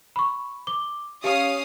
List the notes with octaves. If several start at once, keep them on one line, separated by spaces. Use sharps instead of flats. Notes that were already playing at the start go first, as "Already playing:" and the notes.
B5 C#6
D6 G7
C#4 G4 F5 D#6